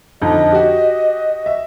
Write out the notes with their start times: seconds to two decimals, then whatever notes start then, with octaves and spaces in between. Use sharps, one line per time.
0.22 F2 D3 D#4 D#5
0.52 F#4 G4
1.46 E5